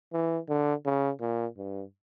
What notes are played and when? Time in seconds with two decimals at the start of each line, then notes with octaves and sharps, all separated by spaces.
0.13 E3
0.49 D3
0.86 C#3
1.21 A#2
1.58 G2